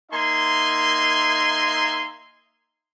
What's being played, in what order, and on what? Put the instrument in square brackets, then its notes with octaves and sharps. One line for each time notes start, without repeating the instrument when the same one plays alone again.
[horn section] A#3 D#4 E5 G#5 C6